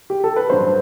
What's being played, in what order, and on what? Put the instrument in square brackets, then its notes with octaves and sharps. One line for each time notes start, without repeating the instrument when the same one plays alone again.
[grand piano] G4
A4
B4
[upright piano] G1 G2 F#3 [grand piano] C5